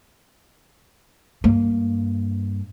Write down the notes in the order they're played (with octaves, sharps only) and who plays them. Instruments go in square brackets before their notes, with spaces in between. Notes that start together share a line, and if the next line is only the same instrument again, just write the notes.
[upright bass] G2 A#3